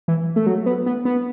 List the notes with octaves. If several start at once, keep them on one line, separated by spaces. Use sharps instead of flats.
E3
A3
F#3
B3
B3
B3